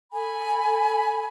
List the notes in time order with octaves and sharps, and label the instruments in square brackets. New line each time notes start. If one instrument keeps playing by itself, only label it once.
[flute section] A4 G#5 B5